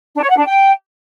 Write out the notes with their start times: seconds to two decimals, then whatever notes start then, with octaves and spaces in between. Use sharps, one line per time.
0.14 D4
0.22 C#5
0.30 F#5
0.37 D4
0.45 G5